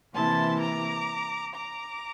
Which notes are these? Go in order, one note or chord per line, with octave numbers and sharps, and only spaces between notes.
C3 E3 A#3 E4 A5 C6
A#5 D6
A#5 D6